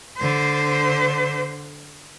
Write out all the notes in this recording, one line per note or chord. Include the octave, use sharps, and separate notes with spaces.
D3 C5